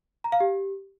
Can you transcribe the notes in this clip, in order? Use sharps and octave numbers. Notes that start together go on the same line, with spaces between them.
A#5
F5
G4